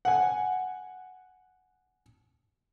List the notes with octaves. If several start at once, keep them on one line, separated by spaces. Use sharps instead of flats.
F#5 G#5